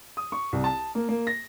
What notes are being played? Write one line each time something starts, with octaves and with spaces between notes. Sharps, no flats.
D#6
C#6
C2
A5
A#3
A#3
A#6